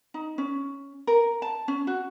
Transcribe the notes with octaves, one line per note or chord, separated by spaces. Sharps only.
D#4
C#4
A#4
A5
C#4
F#4